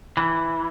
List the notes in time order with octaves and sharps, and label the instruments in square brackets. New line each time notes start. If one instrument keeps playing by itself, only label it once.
[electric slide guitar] E3